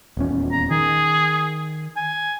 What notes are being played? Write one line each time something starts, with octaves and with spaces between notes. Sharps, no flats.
D#1 E2 C#4
A#5
D#3 G#4
G#5